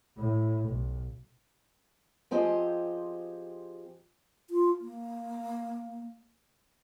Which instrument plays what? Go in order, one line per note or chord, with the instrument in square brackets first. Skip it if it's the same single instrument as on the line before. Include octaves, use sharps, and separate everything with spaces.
[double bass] A2
B1
[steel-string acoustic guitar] F3 C4 G4 G#4 D#5
[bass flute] F4
A#3